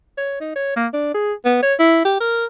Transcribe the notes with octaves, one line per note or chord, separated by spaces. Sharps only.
C#5
D#4
C#5
A#3
D4
G#4
B3
C#5
E4
G4
A#4